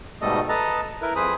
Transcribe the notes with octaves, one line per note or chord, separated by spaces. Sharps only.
G#2 B2 G3 A3 A4 D#5
A4 B4 D#5 A5 A#5
E4 A#4 B4
F2 G#4 B4 C5 B5 D#6